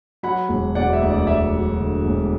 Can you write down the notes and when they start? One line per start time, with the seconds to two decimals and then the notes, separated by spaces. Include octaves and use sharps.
0.23 F#3 F#5 B5
0.49 E1
0.75 E1 D5 F#5
0.93 E5
1.01 D2
1.10 D5
1.22 D5
1.27 F#3 E5
1.54 F#3
1.80 D3
2.05 E1